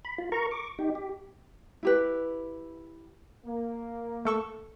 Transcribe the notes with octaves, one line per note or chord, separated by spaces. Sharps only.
B5
F4
A#4 A#5 C#6
C#6 D6
D#4 G4
G4
E4 G4 B4
A#3
A3 A4 C#6